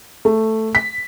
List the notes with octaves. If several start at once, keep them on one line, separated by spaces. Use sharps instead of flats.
A3
B6